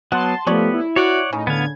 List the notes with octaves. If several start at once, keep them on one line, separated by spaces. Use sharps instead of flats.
F#3 B3 F#5 A5 C6
F3 A3 B3 G4 A4 C#5 D5
E4
F#4 C#5 D5 F#5 C#6
A2 C#3 D#4
D3 B3 F5 G#6